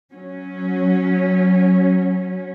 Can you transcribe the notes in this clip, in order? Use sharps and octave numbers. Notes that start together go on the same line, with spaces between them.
F#3 C#4